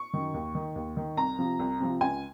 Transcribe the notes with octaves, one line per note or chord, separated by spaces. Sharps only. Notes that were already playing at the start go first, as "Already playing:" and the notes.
Already playing: C#6
F#2 D#3
D#2
D#3
D#2
D#3
C2 A#5
C3 F3
C2
C3 F3
C#2 G#5